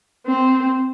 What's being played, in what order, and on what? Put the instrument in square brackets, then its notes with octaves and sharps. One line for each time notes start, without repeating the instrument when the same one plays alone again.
[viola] C4